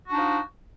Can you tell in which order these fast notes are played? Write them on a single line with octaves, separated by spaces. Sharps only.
F#4 D4 D#4 F3